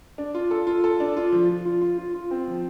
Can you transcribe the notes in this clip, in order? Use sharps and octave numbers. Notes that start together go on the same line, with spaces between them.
D4
F4
A4
F4
A4
D4
F4
F3
F3
F4
F4
F4
F4
C4
F3